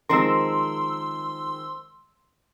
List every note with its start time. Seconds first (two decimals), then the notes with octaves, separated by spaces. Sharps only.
0.09 D#3 F3 G#3 C4 A#4 C6 E6